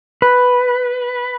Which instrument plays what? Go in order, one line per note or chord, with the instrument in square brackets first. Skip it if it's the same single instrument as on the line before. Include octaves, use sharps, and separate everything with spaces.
[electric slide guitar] B4